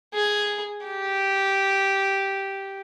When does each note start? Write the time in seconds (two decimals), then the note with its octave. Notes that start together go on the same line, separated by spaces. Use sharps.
0.14 G#4
0.85 G4